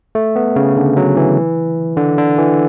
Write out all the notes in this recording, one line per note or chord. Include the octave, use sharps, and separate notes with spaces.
A3
B3
C#3
D3
F#3
E3
D3
D3
E3